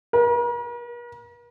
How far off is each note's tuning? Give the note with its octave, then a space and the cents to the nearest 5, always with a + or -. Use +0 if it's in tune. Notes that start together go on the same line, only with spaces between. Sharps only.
A#4 +45